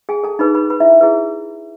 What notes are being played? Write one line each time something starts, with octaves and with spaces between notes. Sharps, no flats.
G#4 G#5
A4 A5
D#4 G#4 B4 B5
B4 B5
B4 B5
E4 E5
E4 G#4 B4